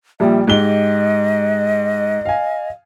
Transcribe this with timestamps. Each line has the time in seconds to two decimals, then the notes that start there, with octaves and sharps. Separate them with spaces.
0.20 A#1 A#2 G3 E5
0.47 G#2 G4 D#5 G7
2.25 F5 G#5